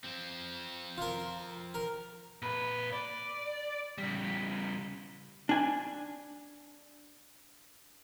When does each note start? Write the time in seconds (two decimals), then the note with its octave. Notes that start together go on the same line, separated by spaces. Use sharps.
0.04 F3 C4
0.98 F4 A#4
1.74 A#4
2.42 A#2 B4
2.93 D5
3.98 C#3 G3
5.49 D4 G#5